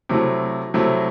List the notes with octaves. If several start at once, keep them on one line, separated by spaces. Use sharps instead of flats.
C3 F#3 A3 E4
C3 F#3 A3 E4